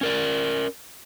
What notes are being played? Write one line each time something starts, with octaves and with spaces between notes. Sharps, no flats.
C#4 A#4 D5